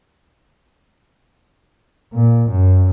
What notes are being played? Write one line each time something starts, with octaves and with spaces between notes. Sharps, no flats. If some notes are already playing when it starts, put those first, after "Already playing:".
A#2
F#2